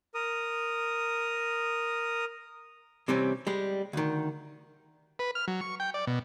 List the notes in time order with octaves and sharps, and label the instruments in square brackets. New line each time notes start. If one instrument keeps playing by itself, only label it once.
[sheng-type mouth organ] A#4 D#6
[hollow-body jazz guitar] C3 E3 G3 C4 C#4
G3 G#3
D2 D#3
[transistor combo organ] B4
F6
F#3
C#6
G5
D5
B2